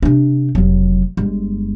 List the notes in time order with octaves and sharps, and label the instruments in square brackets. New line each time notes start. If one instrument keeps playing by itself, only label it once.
[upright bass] C3 D4
F1 F#3
G1 G#3